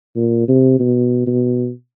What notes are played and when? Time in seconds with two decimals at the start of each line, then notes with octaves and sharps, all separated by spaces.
0.16 A#2
0.48 C3
0.79 B2
1.27 B2